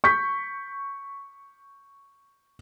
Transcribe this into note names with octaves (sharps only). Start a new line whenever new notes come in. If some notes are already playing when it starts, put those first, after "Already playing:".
C#6 G6 B6